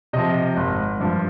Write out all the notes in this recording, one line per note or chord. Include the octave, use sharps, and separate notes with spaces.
C3 F3 D#5
G#1
G2 F3